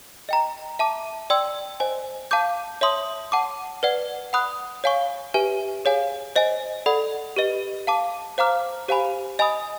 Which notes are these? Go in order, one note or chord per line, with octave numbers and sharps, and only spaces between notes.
D#5 G5 A#5
E5 A5 D6
D5 G5 C6 E6
C5 D#5 G#5
F5 A5 D6 G6
C#5 E5 A5 C6 D#6
F#5 A5 D6
B4 D5 F#5
F#5 B5 D#6 F#6
C#5 F5 G#5 C#6
G4 B4 E5 G#5
G#4 C#5 F5 G#5
C5 D#5 G#5
A4 D5 F#5 B5
G4 B4 D#5
F5 A5 D6
C5 F5 A#5 D6 F6
G4 C5 F5 G#5 B5
D#5 G#5 B5 D#6